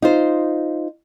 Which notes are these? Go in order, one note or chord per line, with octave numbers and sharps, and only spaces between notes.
D#4 F4 C5